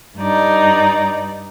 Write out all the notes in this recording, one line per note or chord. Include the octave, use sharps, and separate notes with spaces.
G2 D#4 D5